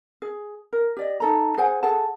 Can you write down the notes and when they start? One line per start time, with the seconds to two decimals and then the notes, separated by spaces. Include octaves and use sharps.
0.22 G#4
0.73 A#4
0.97 G4 D5 D#5
1.20 D#4 A4 A#5
1.58 G#4 C5 F#5 G#5
1.83 G#4 A4 F#5 A5